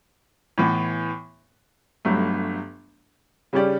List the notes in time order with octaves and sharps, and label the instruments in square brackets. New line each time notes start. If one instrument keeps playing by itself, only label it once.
[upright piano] A2 E3 B3
G1 G2 F#3 A3
C#3 G3 C#4 G4 D5